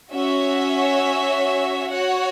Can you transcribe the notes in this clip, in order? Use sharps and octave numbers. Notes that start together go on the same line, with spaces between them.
C#4 F#4 C#5 E5
F#4 C#5 F#5